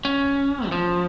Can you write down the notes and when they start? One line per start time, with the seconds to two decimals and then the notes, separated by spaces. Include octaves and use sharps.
0.05 C#4
0.68 D#3
0.72 F3